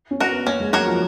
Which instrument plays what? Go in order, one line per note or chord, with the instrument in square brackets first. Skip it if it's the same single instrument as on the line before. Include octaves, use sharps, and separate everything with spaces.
[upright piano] C#4
[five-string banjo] F#4 A#4
[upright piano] B3
[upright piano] A#3 [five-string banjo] C#4
[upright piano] G#3
[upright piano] F#3 [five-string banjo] F#4 A#4 C#5
[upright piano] F3